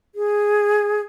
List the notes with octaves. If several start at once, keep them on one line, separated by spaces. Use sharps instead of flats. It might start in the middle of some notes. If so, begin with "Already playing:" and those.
G#4